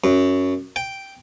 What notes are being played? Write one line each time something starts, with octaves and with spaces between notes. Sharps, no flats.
F#2
G5